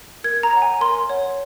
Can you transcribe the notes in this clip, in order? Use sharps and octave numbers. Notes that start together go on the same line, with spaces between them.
A#4 G#6
A#5
C#5 F#5
G#5
A#4 C6
C#5 F#5